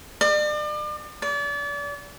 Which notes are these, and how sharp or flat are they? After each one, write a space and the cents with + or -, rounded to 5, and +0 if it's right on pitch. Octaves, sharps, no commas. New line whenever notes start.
D5 +40
D5 -35